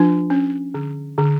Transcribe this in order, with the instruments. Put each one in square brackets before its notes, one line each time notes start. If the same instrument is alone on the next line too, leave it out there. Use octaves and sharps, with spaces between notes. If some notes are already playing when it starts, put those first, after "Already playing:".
Already playing: [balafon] F3 D4 F4
C#4
D3
D3